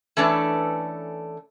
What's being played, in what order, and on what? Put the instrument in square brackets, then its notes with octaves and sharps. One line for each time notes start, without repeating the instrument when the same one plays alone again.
[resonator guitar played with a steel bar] E3 A3 C#4 D4 A4 B4